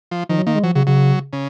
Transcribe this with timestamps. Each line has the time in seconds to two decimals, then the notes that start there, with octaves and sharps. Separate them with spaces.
0.11 F3
0.29 D#3 F3
0.38 F#3
0.46 D#3 A#3
0.55 G#3
0.63 F3 F#3
0.75 C#3 F#3
0.87 C#3 F#3
1.33 C#3